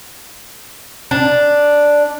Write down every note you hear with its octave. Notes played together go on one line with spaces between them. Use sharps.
D4